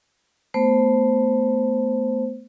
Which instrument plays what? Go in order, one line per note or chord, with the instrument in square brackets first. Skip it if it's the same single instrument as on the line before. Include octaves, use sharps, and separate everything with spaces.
[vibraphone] A3 B3 C5